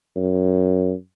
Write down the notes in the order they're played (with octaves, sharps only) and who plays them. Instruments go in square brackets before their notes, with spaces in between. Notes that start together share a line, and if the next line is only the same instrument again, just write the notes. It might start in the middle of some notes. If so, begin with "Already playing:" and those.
[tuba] F#2